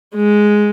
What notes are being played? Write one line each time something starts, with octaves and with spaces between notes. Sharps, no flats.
G#3